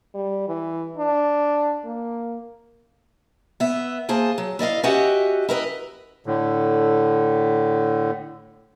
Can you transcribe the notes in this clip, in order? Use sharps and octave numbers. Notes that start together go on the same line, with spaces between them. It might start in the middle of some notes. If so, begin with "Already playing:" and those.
G3
E3
D4
A#3
B3 E5
A#3 G#4 C5 A5
F#3
E4 D5 D#5 F5
C#4 F#4 G4 D#5 E5 F#5
E4 A#4 B4 D#5
A2 D3